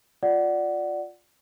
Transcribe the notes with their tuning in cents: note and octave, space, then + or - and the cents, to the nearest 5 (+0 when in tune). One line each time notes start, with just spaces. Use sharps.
F4 +10 D5 +0 F#5 +10